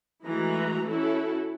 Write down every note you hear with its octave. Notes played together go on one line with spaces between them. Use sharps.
E3 G#3 A3 F#4 A#5
C#4 E4 F#4 A4